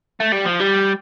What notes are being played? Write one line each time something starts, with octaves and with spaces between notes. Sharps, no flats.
A3
G3
F3
G3